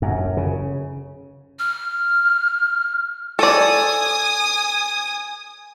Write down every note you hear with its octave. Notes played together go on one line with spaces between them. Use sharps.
F#2
C#3
F6
A4 D5 G#5 D#6